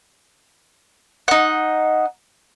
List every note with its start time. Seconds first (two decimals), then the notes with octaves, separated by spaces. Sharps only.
1.28 D#4 F#5